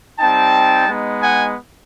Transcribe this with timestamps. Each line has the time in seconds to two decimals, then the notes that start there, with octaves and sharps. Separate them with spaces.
0.19 G3 C4 D#4 G5 A5
0.88 G#3 B3 D#4
1.22 F#5 G#5